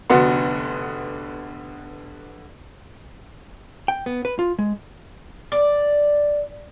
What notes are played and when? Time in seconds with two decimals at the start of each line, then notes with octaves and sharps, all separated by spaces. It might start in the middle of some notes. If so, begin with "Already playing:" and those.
0.10 F1 D3 B3 D4 F#4 C6
3.88 G5
4.06 B3
4.25 B4
4.39 F4
4.59 G#3
5.52 D5